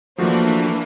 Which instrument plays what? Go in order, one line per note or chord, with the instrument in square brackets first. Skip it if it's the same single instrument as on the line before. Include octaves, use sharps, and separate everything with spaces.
[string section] E3 A#3 D4 [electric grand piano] F3 A3 F#4